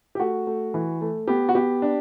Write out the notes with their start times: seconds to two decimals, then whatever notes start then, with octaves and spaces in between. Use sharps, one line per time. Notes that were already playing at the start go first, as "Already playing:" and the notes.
0.15 G4
0.20 A3 F#4
0.47 A3
0.74 E3
1.01 A3
1.27 B3 G4
1.49 F#4
1.55 B3 G4
1.82 D4